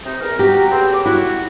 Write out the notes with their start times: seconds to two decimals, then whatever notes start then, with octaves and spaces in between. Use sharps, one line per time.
0.05 C3 D#4
0.21 E2 A#4
0.39 F#4 G4 F#5 A#5
0.70 C#3 B3 C4
0.92 A4 C#5 D6
1.06 E4 F#4